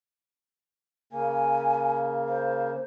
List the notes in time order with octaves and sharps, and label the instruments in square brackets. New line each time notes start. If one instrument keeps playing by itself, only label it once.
[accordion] C#3 A#3 [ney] G#5
[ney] C5